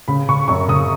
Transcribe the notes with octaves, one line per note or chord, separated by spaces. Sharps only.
C#3 B5
C#3 C#6
F#2 C#6
C#3 D#6